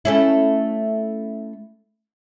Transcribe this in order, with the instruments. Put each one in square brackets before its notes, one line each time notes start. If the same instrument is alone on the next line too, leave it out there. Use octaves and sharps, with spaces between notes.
[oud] A3 C#4 E4